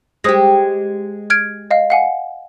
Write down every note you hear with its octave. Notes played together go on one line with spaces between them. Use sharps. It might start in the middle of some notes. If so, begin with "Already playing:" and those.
G#3 G4 C5 D#6 A#6
F6 G#6 D7
D#5 F5
F5 F#5 G#5